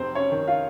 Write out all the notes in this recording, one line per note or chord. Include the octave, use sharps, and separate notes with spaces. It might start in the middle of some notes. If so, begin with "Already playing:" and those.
Already playing: F1 C4 C5
C#4 C#5
D#3
F4 F5